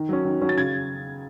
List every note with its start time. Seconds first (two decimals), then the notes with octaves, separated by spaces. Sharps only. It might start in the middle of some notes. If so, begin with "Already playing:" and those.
Already playing: D#3
0.09 F#3 C#4
0.25 D#3
0.41 F#3 C#4
0.49 A6
0.57 C#3 G#6